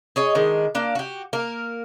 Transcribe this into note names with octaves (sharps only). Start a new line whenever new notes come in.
G#4 C#5 D#5
D#3 G#3 D4
A#3 D4 F5
F#4 G4
A#3 A#4